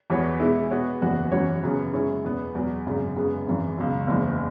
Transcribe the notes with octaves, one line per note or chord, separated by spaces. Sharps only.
E2 E3 B3 F#4 C#5
B2 G#3 E4
B2 B3 F#4 C#5
F#1 E2 E3 B3 F#4
F#2 E3 C#4 F#4 C#5
F#2 C#3 F#3 B3
C#3 G#3 E4 C#5
E2 B2 B3
E2 B2 F#3
G#1 F#2 C#3
F#2 C#3 G#3 B3
G#1 F#2 E3
C#2 B2 F#3
F#1 E2 E3